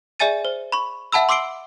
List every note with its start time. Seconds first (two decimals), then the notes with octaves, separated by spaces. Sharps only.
0.20 G#4 D5 E5 G#5 A6 D#7
0.45 C5
0.72 B5 C#6
1.12 E5 F#5 A5 B5 E6
1.29 C6 D6 E6 C7 D7 G7